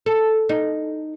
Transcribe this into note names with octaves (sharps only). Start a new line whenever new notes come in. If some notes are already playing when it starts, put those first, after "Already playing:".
A4
D#4